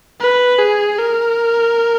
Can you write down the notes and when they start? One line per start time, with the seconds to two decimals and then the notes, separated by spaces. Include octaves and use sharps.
0.20 B4
0.58 G#4
0.98 A#4